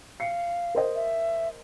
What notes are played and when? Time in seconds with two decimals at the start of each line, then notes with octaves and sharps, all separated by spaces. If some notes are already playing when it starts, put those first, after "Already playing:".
0.20 F5 C7 C#7
0.75 A#4 C5 D#5
0.95 E5